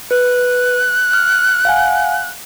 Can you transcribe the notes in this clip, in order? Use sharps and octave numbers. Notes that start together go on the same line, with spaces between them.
B4 F#6
F6
F5 F#5 G#5